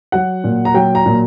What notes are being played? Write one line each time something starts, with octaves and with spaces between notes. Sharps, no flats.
F#3 F#5
A#2
A#5
F#3 G5
A#5
A#2